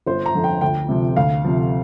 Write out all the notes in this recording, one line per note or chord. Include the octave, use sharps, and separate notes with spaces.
G1 C5
A#5
F2 D3 F3
G5
D2 G5
C3 F3
D2 F5
C3 F3